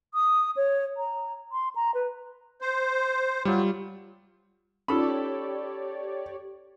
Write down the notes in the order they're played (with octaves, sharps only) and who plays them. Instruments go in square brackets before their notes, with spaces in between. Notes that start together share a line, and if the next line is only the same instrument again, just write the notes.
[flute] D#6
C#5
A#5
C6
A#5
B4
[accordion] C5
[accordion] F#3 [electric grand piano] G3 F4
[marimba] C#4 D#4 F4 [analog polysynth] G4 C#5 D5 [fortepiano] A4 B5